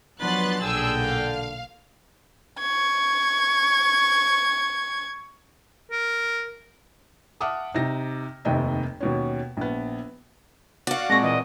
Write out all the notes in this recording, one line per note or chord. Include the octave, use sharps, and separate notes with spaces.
F3 F#3 B3 D4 B4 C6 F#6 A6
B1 A#2 D3 G#4 G5 E6
F5
C#6 G#6
A#4
E5 F#5 A5 D6 D#6 F6
C3 D#4 A#6
F1 D#2 C3 D#5 E5
D#2 B2 C#4
A#1 B3
F#4 D5 F5 F#5
A#2 G#3 C4 C#6 A#6
A#2 E3 D#5